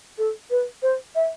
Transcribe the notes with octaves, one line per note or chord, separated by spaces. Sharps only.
A4
B4
C5
E5